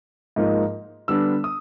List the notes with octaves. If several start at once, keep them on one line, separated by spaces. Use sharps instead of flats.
G#2 F3 A#3 D#4
D3 G3 B3 D4 E6
D#6